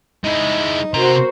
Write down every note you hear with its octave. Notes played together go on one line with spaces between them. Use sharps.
G#3 D#4 E4
C3 F#4 A#4 C5 A#5